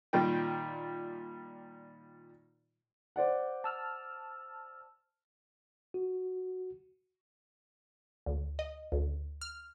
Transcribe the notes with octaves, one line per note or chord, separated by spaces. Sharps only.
A#2 D#3 G3 F4 G5
C5 D5 F#5
A5 E6 F6
F#4
D2
D#5
D2
F6